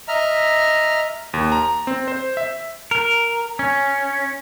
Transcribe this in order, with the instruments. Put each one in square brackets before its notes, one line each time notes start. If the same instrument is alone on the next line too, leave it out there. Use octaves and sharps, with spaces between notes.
[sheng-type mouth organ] D#5 E5 A#5 F6
[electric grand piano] D#2
A#5
C4
C5
E5
[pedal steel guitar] A#4
C#4